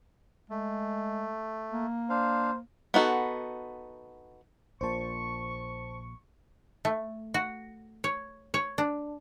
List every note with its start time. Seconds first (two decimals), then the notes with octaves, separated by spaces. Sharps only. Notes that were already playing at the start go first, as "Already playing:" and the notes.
0.50 G#3 A3
1.72 A#3
2.10 D4 C5 F5
2.94 B3 D#4 F#4 A4
4.81 A#1 A#2 C5 A5 C#6
6.85 A3
7.34 F#4
8.04 C#5
8.54 C#5
8.78 D4